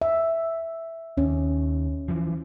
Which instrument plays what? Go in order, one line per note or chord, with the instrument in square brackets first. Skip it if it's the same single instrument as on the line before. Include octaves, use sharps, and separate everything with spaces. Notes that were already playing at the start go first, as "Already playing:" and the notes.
[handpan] E5
[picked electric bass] D#2 [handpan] C#4
[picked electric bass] E3 F3